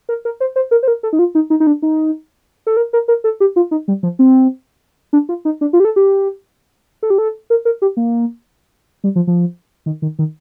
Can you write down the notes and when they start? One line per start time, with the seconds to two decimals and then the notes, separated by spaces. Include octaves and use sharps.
0.09 A#4
0.25 A#4
0.40 C5
0.56 C5
0.71 A#4
0.83 C5
0.88 A#4
1.03 A4
1.13 D#4
1.19 F4
1.35 D#4
1.50 D#4
1.60 D#4
1.67 D4
1.82 D#4
2.67 A4
2.77 A#4
2.93 A#4
3.08 A#4
3.24 A4
3.40 G4
3.56 F4
3.71 D#4
3.88 G3
4.03 F3
4.19 C4
5.13 D4
5.29 F4
5.45 D#4
5.61 D4
5.73 F4
5.80 G4
5.85 A4
5.96 G4
7.03 A4
7.10 G4
7.18 A4
7.50 A#4
7.65 A#4
7.82 G4
7.97 A#3
9.04 G3
9.16 F3
9.27 F3
9.86 D#3
10.02 D#3
10.19 D#3